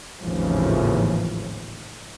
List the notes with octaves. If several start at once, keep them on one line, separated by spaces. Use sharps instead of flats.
G#1 D#2 A2 C#3 E3 F3